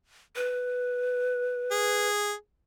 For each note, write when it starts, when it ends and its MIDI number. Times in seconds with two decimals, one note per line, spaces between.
0.36 2.08 71
1.71 2.33 68